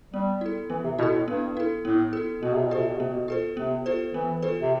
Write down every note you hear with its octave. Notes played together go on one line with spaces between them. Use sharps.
G3 B3
E4 A4
E3 B3
C3
B2 E4 A4
A2
G2 B3
E4 A4
A2 B3
E4 A4
B2 B3
C3
B2
C3 F4 A4 C5
B2
C3 B3
B2
F4 A4 C5
C3 B3
F4 A4 C5
E3 B3
F4 A4 C5
C3